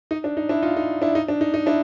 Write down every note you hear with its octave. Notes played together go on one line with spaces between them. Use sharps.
D#4
D4
D#4
D4 E4
D#4 F4
D#4
D4 E4
D#4
D4
D#4
D#4
D4 E4